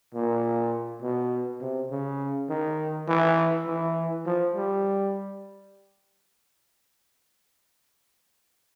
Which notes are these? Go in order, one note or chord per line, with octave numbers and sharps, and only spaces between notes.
A#2
B2
C3
C#3
D#3
E3
E3
F3
G3